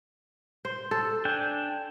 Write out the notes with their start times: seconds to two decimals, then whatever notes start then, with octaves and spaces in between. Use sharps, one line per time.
0.65 C5
0.91 A4
1.25 D4 G5 G#5